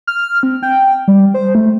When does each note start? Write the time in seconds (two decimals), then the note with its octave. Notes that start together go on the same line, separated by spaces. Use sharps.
0.07 F6
0.43 C4
0.63 G5
1.08 G3
1.34 C5
1.55 A3